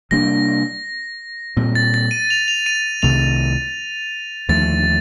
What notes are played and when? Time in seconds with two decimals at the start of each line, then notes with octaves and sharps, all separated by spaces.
0.11 C3 G3 A#3 D4 A#6
1.57 A#2 G3 C4
1.75 A6
1.94 A6
2.11 D#7
2.30 F7
2.48 F7
2.66 D#7
3.02 C2 C3 D#3 A3 F7
4.49 D#2 D3 F3 A3 A6